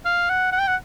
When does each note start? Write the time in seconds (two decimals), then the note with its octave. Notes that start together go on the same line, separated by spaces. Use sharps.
0.05 F5
0.29 F#5
0.52 F#5
0.59 G5
0.67 F#5